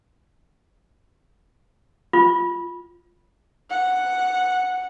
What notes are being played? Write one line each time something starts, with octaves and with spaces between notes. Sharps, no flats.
F4
F#5